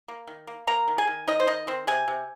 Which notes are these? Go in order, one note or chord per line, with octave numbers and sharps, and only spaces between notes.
A#3
D#3
A#3
A#3 A#4 A#5
D#3
G#4 G#5
D#3
D#3 D#4 D#5
C5
D#3 D#4 D#5
D#3 C4 C5
C3 G#4 G#5
C3